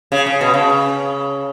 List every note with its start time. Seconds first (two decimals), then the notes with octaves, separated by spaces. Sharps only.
0.12 C#3
0.26 C#3
0.41 B2
0.54 C#3